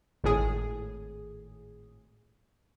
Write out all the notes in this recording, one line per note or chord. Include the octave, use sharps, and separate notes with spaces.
G#1 A2 G#4